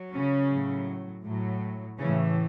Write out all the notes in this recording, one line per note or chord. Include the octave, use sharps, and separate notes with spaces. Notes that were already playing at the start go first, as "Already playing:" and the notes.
Already playing: F#3
C#3 C#4
A2 F#3
A2 F#3
A2 C#3 E3 C#4